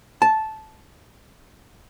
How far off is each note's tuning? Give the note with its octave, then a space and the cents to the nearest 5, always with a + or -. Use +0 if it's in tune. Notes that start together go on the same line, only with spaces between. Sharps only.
A5 -10